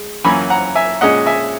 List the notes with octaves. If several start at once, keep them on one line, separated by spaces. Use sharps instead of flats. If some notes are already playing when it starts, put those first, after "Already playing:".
Already playing: G#3
F#2 E3 A#3 C#4 G#5 B5
F#5 A#5
E5 G#5
A#2 G#3 C#4 D#5 F#5
E5 G#5